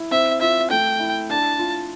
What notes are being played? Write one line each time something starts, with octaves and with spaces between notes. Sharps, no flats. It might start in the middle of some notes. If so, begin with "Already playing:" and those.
Already playing: E4
C4 E5
F4 E5
A3 G5
E4
D4 A5
F4